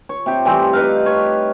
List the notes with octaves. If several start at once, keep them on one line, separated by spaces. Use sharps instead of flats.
C#5
C3 G4
E3 G3 A3 C4
D#4 B4 F5
C#5